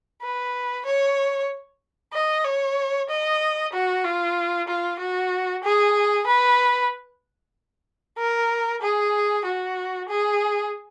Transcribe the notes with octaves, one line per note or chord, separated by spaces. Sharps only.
B4
C#5
D#5
C#5
D#5
F#4
F4
F4
F#4
G#4
B4
A#4
G#4
F#4
G#4